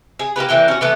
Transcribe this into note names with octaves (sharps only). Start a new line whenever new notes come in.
G#4
A#3 B3 G4 B4
D3 E3 A#3 G5
C#4 F#4
E3 A3 B3 A4